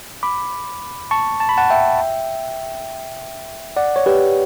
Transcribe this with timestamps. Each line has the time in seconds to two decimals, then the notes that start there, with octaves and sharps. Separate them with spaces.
0.23 B5 D6
1.11 A5 C#6
1.40 A5
1.49 B5
1.58 F#5 A5
1.70 E5 G5
3.77 D5 F#5
3.96 C#5
4.06 G4 B4